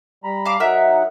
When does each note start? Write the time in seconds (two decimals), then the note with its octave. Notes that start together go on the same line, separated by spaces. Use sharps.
0.24 G3 A#5 B5
0.45 F5 A5 D6
0.60 F#3 D#4 A#4 E5 F#5